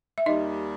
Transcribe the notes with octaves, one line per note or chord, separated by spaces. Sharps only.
E5
D#2 D#3 G3 D#4 D#5